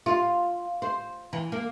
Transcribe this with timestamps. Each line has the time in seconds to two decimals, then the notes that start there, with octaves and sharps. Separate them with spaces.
0.06 F4
0.82 C5
1.33 E3
1.52 A#3